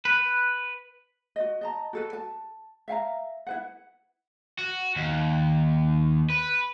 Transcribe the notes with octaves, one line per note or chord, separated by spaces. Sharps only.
B4
F#4 D#5
D#5 A5 A#5
F#4 A4 B4
A5
E5 F5 G#5 A#5
E4 B4 F#5
F#4
D#2
B4